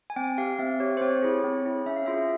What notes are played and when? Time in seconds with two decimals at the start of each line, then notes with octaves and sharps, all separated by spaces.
0.10 G#5
0.16 C4 G5
0.38 G4 F5
0.59 C4 E5
0.80 G4 C#5
0.97 C5
1.01 C4 C#5
1.22 E4 G#4
1.44 C4
1.65 E4 G#4
1.86 C#4 E5
1.96 F5
2.06 F4 G#4 E5